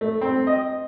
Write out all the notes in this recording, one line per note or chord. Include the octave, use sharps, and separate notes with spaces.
A3
C4
D#5